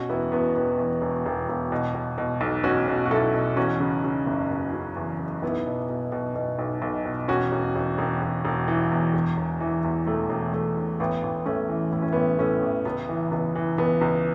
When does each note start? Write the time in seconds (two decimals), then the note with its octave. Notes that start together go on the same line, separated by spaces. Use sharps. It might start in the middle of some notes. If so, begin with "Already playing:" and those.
Already playing: B2 C#4 F#4
0.09 E1 B3 E4
0.32 E2 B3
0.56 E1 B3
0.79 E2
1.02 E1
1.26 E1
1.49 E1
1.72 B2
1.95 B2
2.18 B2
2.41 B1
2.64 B2 C#4 F#4
2.88 B2
3.06 F#4
3.11 B1 E4 A4
3.34 B2
3.57 E2 C#4 F#4
3.80 C#3
4.04 C#3
4.27 F#1
4.50 F#1
4.73 C#3
4.96 E2
5.19 F#1
5.42 B1 B3 E4
5.66 B2
5.89 B2
6.12 B2
6.35 B2
6.59 B1
6.82 B1
7.05 B2
7.28 E1 C#4 F#4
7.52 E1
7.75 E1
7.98 E1
8.22 E1
8.45 E1
8.68 E3
8.91 E2
9.14 E1
9.37 E1
9.60 E3
9.84 E2
10.07 E1 A3
10.30 E1
10.53 E1 A3
10.76 E1
11.00 A1 B3
11.23 A1
11.46 A1 A3 C#4
11.69 E3
11.92 A2 E4
12.02 C#4
12.12 A1 B3 E4
12.39 A2 A3 C#4
12.62 A1
12.85 C#2 B3
13.09 E3
13.31 C#2 B3
13.55 E3
13.78 C#2 B3
14.01 C#2